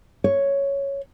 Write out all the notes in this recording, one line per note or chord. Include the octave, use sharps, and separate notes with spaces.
C#5